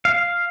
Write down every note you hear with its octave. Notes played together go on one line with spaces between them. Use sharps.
F5